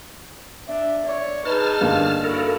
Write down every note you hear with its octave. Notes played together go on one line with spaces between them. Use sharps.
D4 E5
C#5 D5
D#4 G#4 B4 A5 F6
G2 D3 A#3 F5
E4 F#4 A4 A#4